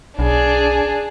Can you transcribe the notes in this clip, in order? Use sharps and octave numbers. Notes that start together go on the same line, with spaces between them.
B1 D4 G#4